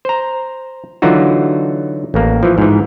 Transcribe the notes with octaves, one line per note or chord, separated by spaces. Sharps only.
C5 A#5
D3 E3 F#3 D#4 F4 F#4
A1 A#3
E3 F3
G#2 E3